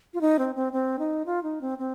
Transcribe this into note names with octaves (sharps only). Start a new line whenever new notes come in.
F4
D#4
C4
C4
C4
D#4
F4
D#4
C4
C4